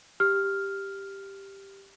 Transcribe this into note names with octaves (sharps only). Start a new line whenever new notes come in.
G4 F6